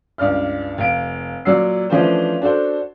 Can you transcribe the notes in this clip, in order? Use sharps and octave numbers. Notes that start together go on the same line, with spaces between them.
C#2 G2 D5 F6
F1 F5 D7
A#2 F#3 D5 F#5 E6 C7
E3 F3 A3 C#4 D4 C5
D4 F#4 A4 C5